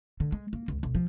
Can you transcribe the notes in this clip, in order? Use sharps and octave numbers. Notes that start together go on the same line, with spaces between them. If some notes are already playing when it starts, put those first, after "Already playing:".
D3
G#3
A#3
C#2
B1
F3